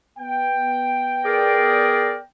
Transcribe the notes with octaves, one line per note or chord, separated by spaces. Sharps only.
B3 G5
G#4 A#4 D5